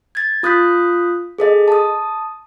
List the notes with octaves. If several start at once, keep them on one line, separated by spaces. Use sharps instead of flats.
G#6 A6
F4 D#6 F#6 G6 B6
G#4 A4 D#5
A5 D#6